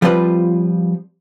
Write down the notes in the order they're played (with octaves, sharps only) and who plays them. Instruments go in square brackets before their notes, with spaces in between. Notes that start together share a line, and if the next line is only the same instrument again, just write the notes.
[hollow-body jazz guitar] F3 G3 C4 F4 B4